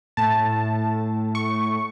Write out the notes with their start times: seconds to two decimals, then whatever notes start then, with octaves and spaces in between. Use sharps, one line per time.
0.17 A2 A5
1.35 C#6